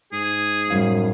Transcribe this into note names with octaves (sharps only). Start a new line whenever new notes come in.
G#2 G#4
F#2 A2 G3 F5